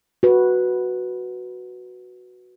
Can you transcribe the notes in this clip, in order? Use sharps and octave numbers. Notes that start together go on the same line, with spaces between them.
F#4 B4